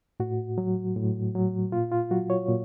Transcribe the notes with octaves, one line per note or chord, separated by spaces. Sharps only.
A2 F#4
F#3
A2
F#3
A#2 F4
F4
F#3 F#4
C#5
A#2